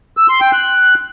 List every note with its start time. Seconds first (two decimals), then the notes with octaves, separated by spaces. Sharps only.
0.17 E6
0.29 C6
0.41 G5
0.52 F#6